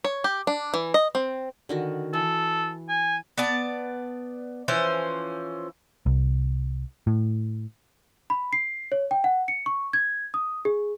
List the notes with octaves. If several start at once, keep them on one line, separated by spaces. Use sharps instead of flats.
C#5
G4
D4
E3
D#5
C4
D3 D#3 F#4
E3 A4
G#5
B3 D5 A5
E3 F3 C#4 C5
C2
A2
B5
C7
C#5
G5
F#5
C#7
C#6
G#6
D#6
G#4